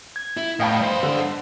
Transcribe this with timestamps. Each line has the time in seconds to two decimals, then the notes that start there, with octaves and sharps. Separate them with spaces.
0.16 G#6
0.37 E4
0.60 A2 D#5 F5 G5 A5 B5
0.80 G2 C5
1.03 D3